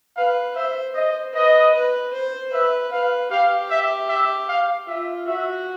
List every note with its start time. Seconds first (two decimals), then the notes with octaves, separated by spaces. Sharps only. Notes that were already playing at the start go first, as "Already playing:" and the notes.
0.16 B4 F5
0.55 C5 E5
0.95 C5 D#5
1.34 B4 D#5
1.74 B4
2.13 C5
2.52 B4 E5
2.92 B4 F5
3.31 G4 F5
3.70 E5
4.09 E5
4.49 F5
4.88 F4 E5
5.27 F#4 E5